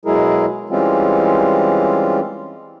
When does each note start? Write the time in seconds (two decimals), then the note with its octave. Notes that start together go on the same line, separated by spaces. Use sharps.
0.05 B2 F#3 G#3 E4 G#4 A#4
0.70 E3 G3 G#3 C4 C#4 F4